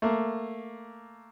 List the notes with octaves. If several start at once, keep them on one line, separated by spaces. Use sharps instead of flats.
A3 A#3